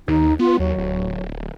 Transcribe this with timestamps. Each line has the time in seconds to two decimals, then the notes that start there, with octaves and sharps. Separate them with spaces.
0.08 D#2 D#4
0.39 B3 F4
0.59 D#2 F#3
0.78 D1